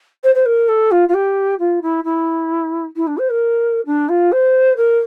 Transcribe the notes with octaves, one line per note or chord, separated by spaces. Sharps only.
C5
C5
A#4
A4
F4
F4
G4
F4
E4
E4
E4
D4
C5
A#4
D4
F4
C5
A#4